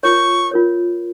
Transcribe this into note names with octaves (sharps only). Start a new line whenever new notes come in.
F4 A#4 C#5 C#6
F4 A#4 C#5